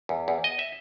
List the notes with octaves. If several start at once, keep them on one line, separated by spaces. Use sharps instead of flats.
E2
E2
D#5
E5